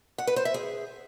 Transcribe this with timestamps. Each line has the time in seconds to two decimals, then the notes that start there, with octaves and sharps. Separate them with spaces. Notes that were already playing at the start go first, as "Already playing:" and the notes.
0.18 F#5
0.27 B4
0.36 C5
0.45 E5
0.54 G#4